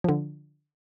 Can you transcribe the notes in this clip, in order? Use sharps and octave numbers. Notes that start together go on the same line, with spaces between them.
D3 F3